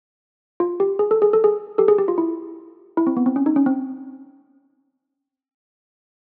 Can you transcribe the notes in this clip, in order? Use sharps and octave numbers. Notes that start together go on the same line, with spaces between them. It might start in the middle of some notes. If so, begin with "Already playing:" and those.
F4
G4
G#4
A4
G#4
A4
G#4
G4 A4
G#4
G4
F4
E4
E4
C4
B3
C4
C#4
D#4
C#4
C4